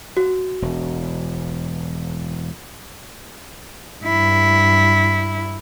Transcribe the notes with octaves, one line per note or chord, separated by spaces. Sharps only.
F#4
E1
G2 E4